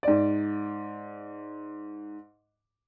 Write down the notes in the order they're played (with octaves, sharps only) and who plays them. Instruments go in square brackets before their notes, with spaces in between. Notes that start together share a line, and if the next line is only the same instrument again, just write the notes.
[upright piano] G#2 D5